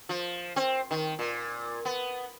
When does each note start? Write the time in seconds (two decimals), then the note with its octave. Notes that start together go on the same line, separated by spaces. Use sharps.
0.09 F3
0.56 C4
0.91 D#3
1.19 A#2
1.85 B3